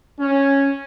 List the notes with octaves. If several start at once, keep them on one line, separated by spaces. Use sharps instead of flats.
C#4